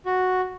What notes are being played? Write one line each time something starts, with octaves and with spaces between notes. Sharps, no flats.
F#4